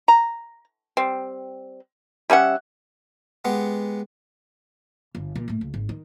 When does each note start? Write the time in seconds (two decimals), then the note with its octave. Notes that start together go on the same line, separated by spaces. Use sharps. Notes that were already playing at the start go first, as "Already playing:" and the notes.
0.08 A#5
0.97 G3 C4
2.30 G3 C#4 E5 F#5
3.45 G#3 B3 G4 F#5
5.15 G1
5.35 A#2 E3
5.48 A2 A3
5.61 C#2
5.74 G#1
5.89 D#3